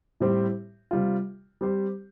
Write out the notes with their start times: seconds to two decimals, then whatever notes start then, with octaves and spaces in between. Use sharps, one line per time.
0.20 A2 G3 C4 G4 C5
0.91 C3 G3 F4
1.61 G3 C4 G4 C5